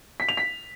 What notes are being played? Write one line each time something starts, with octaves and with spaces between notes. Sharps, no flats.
B6
F7
B6